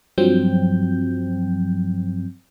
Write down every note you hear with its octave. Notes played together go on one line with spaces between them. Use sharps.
G2 F3 F#3 C4 G5 G6